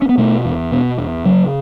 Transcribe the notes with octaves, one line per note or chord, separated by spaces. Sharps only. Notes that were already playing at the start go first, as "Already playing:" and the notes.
C#4
B3
B2 A3
E2
B2 B3
E2
C#3 F#3